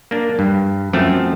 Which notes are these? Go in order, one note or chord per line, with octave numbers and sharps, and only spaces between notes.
A#3 D4
G2
F#2 F3 A3 C4